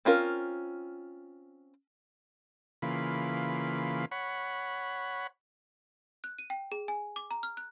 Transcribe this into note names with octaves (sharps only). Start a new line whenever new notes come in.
C4 C#4 F4 A#4
C#3 E3 A#3 F4 B5
C#5 F#5 B5
F#6
D#7
G5
G#4
G#5
D6
A#5
F6
F#6